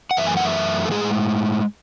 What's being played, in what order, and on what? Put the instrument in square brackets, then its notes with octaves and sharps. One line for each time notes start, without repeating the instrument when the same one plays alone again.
[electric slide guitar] F#5
F#2 E3 A3 E5
G#5
F#5
E5
A4
A2 G#3 G#4